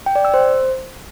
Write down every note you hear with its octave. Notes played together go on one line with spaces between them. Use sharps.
G5
D5
E6
C5